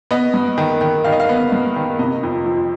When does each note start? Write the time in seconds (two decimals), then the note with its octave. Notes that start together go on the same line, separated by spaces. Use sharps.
0.11 B3 D#5
0.34 G2
0.58 D#3
0.81 D#3
1.04 D#3 F5
1.12 D#5
1.20 F5
1.29 B3
1.52 G2
1.76 D#3
1.99 C3 D#5
2.23 F2
2.46 F3